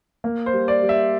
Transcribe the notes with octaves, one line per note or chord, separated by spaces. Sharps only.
A#3
C5
G3
D5
G3
E5